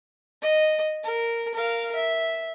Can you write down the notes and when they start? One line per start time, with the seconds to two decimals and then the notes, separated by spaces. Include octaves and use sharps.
0.42 D#5
1.04 A#4
1.54 A#4 F5
1.95 E5